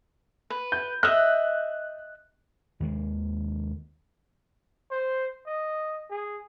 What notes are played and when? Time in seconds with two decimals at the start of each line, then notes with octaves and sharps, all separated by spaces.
0.50 B4
0.72 G6
1.03 D#5 E5 F#6
2.80 D#2 D#3 G#3
4.91 C5
5.46 D#5
6.10 G#4